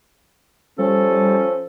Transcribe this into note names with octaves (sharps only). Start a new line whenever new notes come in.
F3 G3 C#4 A4